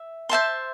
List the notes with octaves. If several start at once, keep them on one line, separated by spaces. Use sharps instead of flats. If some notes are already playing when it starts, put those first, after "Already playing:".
Already playing: E5
C5 E5 A5 C6